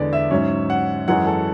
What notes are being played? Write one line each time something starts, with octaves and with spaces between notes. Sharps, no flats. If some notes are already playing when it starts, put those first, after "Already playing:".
Already playing: E2 D3 G#3 B3 D5
E5
G#2 F#3 C#4
F#5
F#2 E3 G#3 C#4 F#5
A4